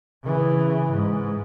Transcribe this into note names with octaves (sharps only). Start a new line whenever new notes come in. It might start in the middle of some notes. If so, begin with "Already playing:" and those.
C#3 E3
G#2